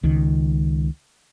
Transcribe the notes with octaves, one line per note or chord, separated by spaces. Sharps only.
C#2 D#3